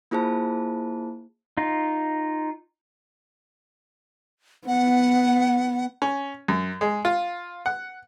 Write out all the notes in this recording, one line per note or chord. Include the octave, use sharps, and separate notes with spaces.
A#3 E4 F4 G#4 C5 A5
D#4 F4
B3 F#5
C#4
F#2
G#3
F4
F#5